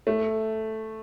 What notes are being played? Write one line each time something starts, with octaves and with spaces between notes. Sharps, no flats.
A3